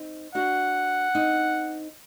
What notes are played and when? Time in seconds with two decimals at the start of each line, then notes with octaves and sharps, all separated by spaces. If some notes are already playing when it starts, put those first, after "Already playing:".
Already playing: C4 D#4
0.35 D4 F#4 F#5
1.15 C4 D#4